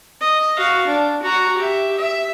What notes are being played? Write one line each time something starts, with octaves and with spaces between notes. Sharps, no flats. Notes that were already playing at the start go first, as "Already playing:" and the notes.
D#5
F#4 F5
D4
F#4 A#5
G4 E5
E5